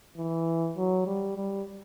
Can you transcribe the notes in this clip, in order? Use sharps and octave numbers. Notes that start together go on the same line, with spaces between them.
E3
F#3
G3
G3